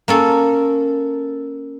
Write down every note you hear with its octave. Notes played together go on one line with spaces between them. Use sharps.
A#3 C#4 A4